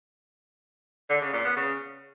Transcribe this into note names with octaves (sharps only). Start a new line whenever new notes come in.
D3
C#3
A#2
B3
C#3